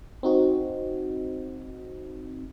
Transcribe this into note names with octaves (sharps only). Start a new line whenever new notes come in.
C4 D#4 F#4